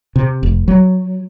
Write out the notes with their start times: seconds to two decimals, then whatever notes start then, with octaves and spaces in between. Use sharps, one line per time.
0.16 C3
0.43 F1
0.68 F#3